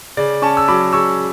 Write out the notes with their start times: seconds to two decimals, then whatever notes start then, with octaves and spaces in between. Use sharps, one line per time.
0.17 C#3 D5
0.42 C#4 A5 C#6
0.57 E6
0.68 F#3 B5 D6
0.93 C#3 C#6 E6